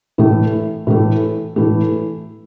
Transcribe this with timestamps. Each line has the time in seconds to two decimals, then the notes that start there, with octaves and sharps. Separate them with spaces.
0.18 A2 E3 A3
0.87 A2 E3 A3
1.56 A2 E3 A3